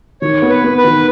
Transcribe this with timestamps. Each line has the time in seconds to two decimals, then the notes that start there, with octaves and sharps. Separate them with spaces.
0.22 D#3 C#5
0.42 B3
0.50 B4
0.64 B3
0.78 B4
0.84 D#3